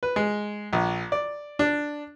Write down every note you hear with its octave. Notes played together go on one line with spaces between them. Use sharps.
B4
G#3
A#1
D5
D4